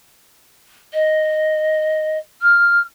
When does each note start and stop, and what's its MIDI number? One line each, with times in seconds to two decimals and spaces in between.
0.93 2.17 75
2.41 2.79 89